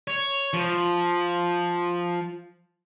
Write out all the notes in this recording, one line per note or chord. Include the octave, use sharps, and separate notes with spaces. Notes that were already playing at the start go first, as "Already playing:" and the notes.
C#5
F3